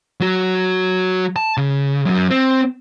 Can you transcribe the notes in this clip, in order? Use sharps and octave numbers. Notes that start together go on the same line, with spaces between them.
F#3 F#4
A5
C#3
F#2 F#3
C4